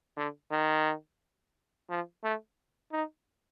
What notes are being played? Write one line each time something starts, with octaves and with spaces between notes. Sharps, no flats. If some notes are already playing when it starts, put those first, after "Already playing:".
D3
D#3
F3
A3
D#4